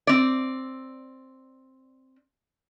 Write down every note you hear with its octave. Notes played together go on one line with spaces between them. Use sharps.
C4 D5